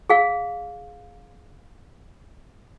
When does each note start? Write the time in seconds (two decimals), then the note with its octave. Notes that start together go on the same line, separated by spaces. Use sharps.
0.10 G#4 F5